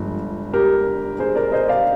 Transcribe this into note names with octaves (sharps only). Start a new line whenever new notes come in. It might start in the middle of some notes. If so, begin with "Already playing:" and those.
Already playing: G1 G2 F3 G#3
G4 A#4
G#4 C5
A#4 D5
C5 D#5
D5 F5